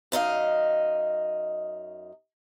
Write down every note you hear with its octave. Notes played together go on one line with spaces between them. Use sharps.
F#2 D#4 D#5 F5